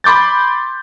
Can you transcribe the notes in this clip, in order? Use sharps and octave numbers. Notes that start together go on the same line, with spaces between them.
B5 C6 D6 G6 A6